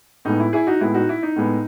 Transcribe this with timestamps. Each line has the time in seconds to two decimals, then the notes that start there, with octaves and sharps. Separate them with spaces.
0.25 A2 G#3 B3 D#4
0.40 E4
0.53 E4 G#4
0.67 D#4 F#4
0.80 A2 G#3 B3 E4
0.94 D#4 F#4
1.09 E4
1.23 D#4
1.36 A2 G#3 B3